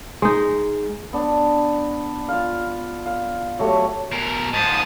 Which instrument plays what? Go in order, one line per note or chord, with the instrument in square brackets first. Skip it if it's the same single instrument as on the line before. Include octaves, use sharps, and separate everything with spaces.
[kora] G#3 D#4
[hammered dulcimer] B3 D4
F4 F5
F5
F#3 A3 G4 C#5
[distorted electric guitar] B2 A#4
[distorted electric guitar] G#2 F3 [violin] A5 D#6